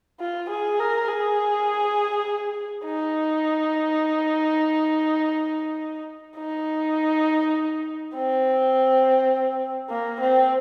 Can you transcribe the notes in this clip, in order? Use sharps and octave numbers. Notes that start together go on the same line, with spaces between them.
F4
G#4
A#4
G#4
D#4
D#4
C4
A#3
C4